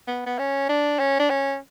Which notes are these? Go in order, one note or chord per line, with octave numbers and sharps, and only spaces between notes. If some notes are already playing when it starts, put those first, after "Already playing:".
B3
B3
C#4
D4
C#4
D4
C#4